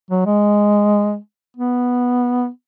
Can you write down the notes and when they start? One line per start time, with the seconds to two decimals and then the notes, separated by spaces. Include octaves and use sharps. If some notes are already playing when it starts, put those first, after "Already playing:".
0.11 F#3
0.26 G#3
1.57 B3